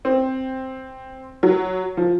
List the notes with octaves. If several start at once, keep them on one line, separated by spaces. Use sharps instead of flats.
C4
F#3
F3